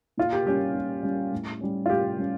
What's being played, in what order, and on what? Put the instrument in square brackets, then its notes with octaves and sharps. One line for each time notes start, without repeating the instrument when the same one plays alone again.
[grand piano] A#2 [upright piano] F4
[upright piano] G4
[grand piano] G3 C#4 [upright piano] G4
[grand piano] A#2
G3 C#4
A2
G3 C#4
[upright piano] F4
[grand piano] A2 [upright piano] G4
[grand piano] G3 C#4